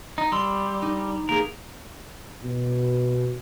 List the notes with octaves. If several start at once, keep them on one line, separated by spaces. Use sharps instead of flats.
D#4
G3 C6 E6
D#4
A#3 G4 G#4 A#4
B2